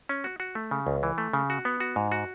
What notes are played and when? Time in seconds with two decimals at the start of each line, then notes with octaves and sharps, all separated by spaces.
0.09 C#4
0.24 F#4
0.40 F#4
0.55 A3
0.71 C#3
0.87 C#2
1.03 E3
1.18 A3
1.33 C#3
1.50 F#4
1.65 B3
1.80 F#4
1.96 G#2
2.12 F#4